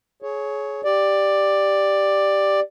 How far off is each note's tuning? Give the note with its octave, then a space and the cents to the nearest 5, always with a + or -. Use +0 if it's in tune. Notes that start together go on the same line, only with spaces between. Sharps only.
G#4 +25 C#5 +5
G4 +0 D5 +5